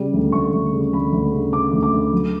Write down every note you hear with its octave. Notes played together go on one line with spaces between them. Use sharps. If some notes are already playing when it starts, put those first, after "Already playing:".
Already playing: C#3 G3
D2
D2 C#6
D2
C#3
D2 B5
D2
C#3
C#3 D6
D2
D6
D2
F#3